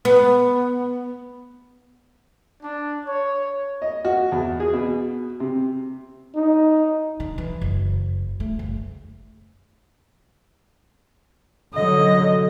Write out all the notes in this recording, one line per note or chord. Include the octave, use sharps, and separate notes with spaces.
B3
D4
C#5
D#5
F#4
E2
G#4
B2
C3
D#4
D3
E3
F#1
A3
F#1
D3 F#3 D#5